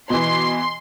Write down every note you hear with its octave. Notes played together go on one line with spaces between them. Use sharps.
B2 E3 C6